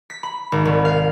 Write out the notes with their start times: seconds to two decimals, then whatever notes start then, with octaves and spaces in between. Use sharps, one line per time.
0.10 B6
0.23 B5
0.52 G#1
0.65 C2
0.85 F5